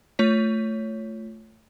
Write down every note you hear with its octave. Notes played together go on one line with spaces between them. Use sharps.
A3 F4 C#5 B6